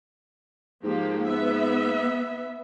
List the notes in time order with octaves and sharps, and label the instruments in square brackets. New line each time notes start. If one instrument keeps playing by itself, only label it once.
[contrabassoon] G#2 [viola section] F3 A#3 G4
[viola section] B3 E5